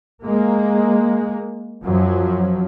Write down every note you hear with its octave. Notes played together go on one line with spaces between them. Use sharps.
G#3 A#3
F#2 F3 F#3